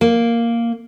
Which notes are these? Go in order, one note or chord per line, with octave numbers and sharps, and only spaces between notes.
A#3